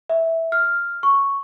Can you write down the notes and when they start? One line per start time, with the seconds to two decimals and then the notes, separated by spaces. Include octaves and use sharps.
0.10 E5
0.52 F6
1.03 C#6